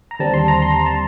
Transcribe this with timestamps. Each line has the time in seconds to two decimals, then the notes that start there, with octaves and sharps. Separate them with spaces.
0.11 A#5
0.19 D#2 D3 G3 C4 A5
0.34 C6
0.48 A#5
0.62 C6
0.76 A#5
0.86 A5